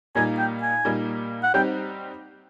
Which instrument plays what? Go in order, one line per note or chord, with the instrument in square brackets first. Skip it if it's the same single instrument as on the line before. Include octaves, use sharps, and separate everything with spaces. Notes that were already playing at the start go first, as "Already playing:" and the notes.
[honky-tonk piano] A#2 G3 A#3 D#4 [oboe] G#5
[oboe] G5
G#5
[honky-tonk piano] A#2 G3 A#3 D#4
[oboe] F#5
[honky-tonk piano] G3 C4 D#4 G4 [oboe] G5